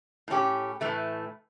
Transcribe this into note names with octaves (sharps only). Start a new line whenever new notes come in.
A2 G3 C#4 G4
A2 E3 A3